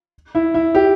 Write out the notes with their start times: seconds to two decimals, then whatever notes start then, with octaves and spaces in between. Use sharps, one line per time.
0.35 E4
0.54 E4
0.75 G4